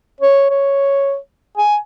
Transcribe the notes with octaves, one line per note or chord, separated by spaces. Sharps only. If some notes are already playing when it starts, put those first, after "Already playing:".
C#5
C#5
G#5